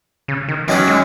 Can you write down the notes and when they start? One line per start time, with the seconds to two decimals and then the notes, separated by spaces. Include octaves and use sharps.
0.28 C#3
0.48 D#3
0.67 F#2 D#3 E3 F#3 C#4 F#4
0.88 G#3